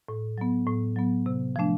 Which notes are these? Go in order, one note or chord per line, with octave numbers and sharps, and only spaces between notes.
A2
F#3 B3
A2
F#3 B3
C3
F3 A3 D4